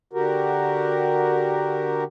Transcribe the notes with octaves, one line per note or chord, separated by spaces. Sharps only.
D3 F#4 G4 A#4